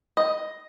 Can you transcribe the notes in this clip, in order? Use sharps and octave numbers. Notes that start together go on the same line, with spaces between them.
D#5